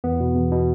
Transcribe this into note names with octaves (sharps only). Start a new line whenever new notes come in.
E2 B3
B2
E2
B2